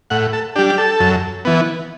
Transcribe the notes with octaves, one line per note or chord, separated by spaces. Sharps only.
A2 F#5
A4
G3 D4 G4
G4
A4
F#2
E3 B3